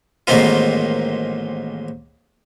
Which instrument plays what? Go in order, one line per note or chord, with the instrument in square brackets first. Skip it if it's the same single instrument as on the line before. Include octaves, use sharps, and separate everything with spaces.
[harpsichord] A1 G#2 D#3 A#3 C4 F4